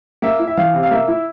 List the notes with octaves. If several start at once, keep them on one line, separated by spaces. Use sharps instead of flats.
A#3 E5
E4
E5
E3 F5
C3
F5
A#3 E5
E4